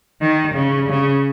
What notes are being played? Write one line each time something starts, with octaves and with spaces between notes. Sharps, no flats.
D#3
C#3
C#3